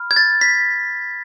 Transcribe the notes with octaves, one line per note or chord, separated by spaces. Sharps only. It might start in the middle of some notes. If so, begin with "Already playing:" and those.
Already playing: B5 F6
G#6
A6
B6